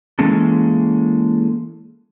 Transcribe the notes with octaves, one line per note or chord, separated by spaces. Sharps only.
E3 G#3 A#3 C#4 G#4 A4